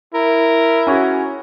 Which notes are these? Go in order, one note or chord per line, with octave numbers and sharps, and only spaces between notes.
E4 A#4
C#4 F#4 G#4